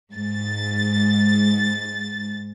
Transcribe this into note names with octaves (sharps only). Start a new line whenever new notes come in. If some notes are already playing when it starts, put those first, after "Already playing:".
G#2 A6